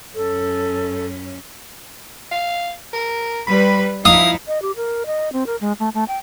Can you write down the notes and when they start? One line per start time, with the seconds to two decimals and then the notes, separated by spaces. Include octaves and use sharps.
0.15 F#2 C#4 A4
2.31 F5
2.93 A#4
3.47 G3 B4 B5
4.05 F3 D#4 E4 F5 D#6
4.47 D#5
4.62 G4
4.76 A#4
5.06 D#5
5.33 C4
5.46 A#4
5.61 G#3
5.80 A3
5.94 A3
6.08 G5